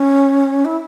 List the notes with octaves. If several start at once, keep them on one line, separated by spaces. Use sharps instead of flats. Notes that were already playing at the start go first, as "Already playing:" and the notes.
Already playing: C#4
E4